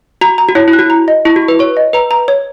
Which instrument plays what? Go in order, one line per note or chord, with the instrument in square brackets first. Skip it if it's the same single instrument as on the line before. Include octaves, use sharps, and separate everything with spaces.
[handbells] F#4 [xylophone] A#5
[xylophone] A#5
[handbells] F#4
[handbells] E4 [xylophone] C#5
[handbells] E4
[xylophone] F#6
[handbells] F#4
[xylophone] A#5
D#5
[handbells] E4 [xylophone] C#6
[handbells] F#4
[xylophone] C#6
[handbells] B4
[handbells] C#5 [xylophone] C#6
[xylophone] D#5
[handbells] B4 [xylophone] A#5
[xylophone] A#5
C#5